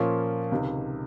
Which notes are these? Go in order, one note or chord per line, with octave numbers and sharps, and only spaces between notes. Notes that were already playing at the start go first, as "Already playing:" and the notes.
Already playing: A#2 F3 A#3 C#4 F4
C#2 C3 D#3